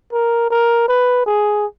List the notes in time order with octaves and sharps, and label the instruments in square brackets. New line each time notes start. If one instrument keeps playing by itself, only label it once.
[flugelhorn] A#4
A#4
B4
G#4